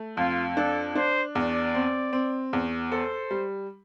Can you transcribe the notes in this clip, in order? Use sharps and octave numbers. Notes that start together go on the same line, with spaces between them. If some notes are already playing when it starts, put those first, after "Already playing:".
Already playing: A3
F2 F4
D4 A4
D4 C5
E2 D5
C4
C4
E2
A4 C5
G3